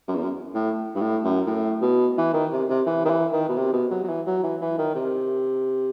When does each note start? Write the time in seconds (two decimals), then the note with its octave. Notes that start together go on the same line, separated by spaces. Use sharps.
0.08 F#2
0.15 E2
0.22 F#2
0.54 A2
0.95 G2
1.01 A2
1.24 F#2
1.46 A2
1.82 B2
2.17 E3
2.34 D#3
2.52 C3
2.69 C3
2.86 E3
3.05 D#3
3.10 E3
3.33 D#3
3.49 B2
3.57 C3
3.73 B2
3.91 F#3
4.04 F#3
4.09 E3
4.26 F#3
4.43 E3
4.61 E3
4.78 D#3
4.95 C3